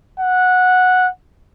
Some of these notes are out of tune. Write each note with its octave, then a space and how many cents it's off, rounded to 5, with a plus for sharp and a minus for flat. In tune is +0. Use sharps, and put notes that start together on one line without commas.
F#5 -10